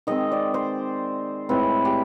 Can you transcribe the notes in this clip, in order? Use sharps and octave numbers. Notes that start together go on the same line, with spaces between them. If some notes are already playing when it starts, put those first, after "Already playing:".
D#3 G#3 C4 D#5
D5
C5
A2 E3 G#3 C4 B4
G4